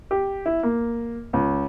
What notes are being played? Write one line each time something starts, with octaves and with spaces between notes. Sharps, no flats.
G4
E4
A#3
C#2